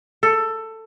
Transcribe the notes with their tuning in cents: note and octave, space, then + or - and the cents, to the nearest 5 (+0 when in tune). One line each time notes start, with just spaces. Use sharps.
A4 +15